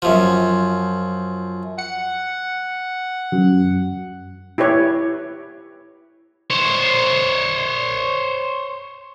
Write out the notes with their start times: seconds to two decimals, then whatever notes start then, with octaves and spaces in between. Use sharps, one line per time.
0.02 F#2 F3
1.79 F#5 C#7
3.32 F#2
4.58 E4 G4 B4 C#5
6.50 C5 C#5